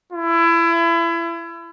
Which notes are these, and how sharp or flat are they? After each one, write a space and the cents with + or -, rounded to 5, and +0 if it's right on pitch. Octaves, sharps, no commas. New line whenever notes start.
E4 +30